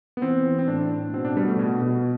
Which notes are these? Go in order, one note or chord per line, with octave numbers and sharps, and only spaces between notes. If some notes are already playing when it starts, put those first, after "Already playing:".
B3
E3 C4
E3
C4
A2 D4
A2
B2 C4
D4
B2 G3
A3
B2
B2